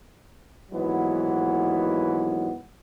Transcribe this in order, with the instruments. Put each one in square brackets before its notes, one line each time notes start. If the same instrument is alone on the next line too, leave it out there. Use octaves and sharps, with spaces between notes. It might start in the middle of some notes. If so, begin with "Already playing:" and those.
[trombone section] D#2 G#2 E3 F#3 B3